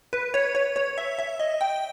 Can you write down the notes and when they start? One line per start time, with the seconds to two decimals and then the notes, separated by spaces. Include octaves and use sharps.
0.13 B4
0.34 C#5
0.55 C#5
0.76 C#5
0.98 E5
1.19 E5
1.40 D#5
1.61 G5